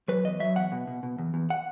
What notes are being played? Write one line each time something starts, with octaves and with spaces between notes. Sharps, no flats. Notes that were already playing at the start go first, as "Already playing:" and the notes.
F#3 B4
E2 D#5
F#3 E5
E2 F#5
B2
B2
B2
E2
E2
F#5